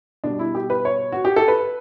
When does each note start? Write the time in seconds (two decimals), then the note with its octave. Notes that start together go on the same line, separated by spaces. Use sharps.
0.24 B2 G3 D4
0.39 E4
0.55 G4
0.70 B4
0.85 C#5
1.12 F#4
1.25 G4
1.36 A4
1.48 B4